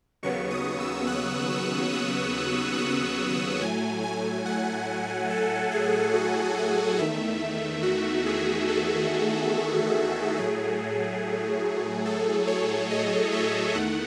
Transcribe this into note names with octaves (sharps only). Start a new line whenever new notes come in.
D#2 C#3 F#3 B3 C#6
D#6
E6
F#6
E6
D#6
F#6
A2 F#3 A3 G#5
G#5
F#5
A4
G#4
F#4
G#4
E2 D#3 A3 E5
F#4
G#4
A4
A2 F#3 A3 G#4
A4
C#5
D#5
E5
E2 D#3 A3 F#5